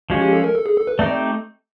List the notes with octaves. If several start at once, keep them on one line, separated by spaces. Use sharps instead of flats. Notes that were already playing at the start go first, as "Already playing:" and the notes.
F3 G#3 C#4 F#4
G4
A4
A#4
A4
G#4
A4
B4
A3 C4 D#4 G4 D5